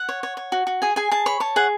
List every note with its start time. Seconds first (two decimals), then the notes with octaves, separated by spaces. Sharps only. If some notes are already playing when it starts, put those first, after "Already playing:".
Already playing: F#5
0.09 C#5
0.23 C#5
0.37 C#5
0.52 F#4
0.67 F#4
0.82 G#4 G#5
0.96 G#4 G#5
1.11 G#4 A5
1.26 C#5 B5
1.40 C#5 A5
1.56 G#4 F#5